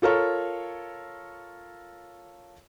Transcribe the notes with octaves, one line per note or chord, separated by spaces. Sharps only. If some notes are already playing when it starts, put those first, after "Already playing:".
F4 A4 A#4 C#5